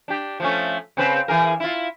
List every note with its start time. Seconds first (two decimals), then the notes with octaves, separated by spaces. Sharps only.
0.08 D4 G4
0.40 F3 A3 C#4
0.97 C#3 C4 B4
1.28 E3 G#4 A#4
1.60 E4 F4